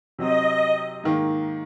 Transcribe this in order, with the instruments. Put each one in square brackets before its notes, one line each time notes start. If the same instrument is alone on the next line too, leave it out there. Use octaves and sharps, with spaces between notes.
[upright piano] C3 F#3 C4 [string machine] D#5
[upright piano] G#2 D#3 A#3